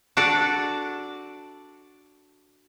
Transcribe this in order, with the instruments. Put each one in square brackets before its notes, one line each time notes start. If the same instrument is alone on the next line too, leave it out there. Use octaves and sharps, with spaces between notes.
[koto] D4 F#4 A4 D5